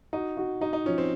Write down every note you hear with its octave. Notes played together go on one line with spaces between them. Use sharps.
D#4 F#4
F#4
D#4 F#4
D#4
F3 C#4
C4